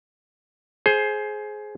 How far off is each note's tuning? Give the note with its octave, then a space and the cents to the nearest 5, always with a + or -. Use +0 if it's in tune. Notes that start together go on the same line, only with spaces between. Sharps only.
G#4 +20 C5 +10